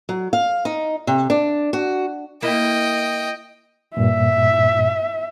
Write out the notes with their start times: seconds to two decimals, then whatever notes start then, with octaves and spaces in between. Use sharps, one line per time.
0.09 F#3
0.33 F5
0.65 D#4
1.07 C3
1.30 D4
1.73 F#4
2.42 A#3 E4 D#5 G5
3.97 G2 A#2 E5